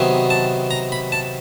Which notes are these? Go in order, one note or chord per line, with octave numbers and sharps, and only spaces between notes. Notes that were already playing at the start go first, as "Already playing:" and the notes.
Already playing: C3 D#3 F#3 B3
A5
A#5
B5
A5